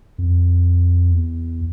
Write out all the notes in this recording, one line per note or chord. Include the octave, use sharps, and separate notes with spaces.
F2
E2